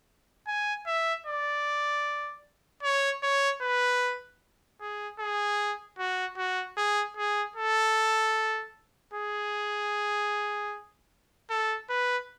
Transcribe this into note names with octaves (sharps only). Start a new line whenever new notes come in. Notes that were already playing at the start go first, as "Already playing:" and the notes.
G#5
E5
D5
C#5
C#5
B4
G#4
G#4
F#4
F#4
G#4
G#4
A4
G#4
A4
B4